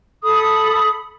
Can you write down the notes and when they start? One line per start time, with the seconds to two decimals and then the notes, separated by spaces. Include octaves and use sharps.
0.24 A4 B5 D#6